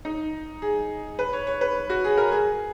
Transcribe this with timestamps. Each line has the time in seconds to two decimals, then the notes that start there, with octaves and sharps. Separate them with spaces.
0.05 D#4
0.62 G#4
1.19 B4
1.33 C#5
1.47 C#5
1.61 B4
1.90 F#4
2.04 G#4
2.17 A#4
2.32 G#4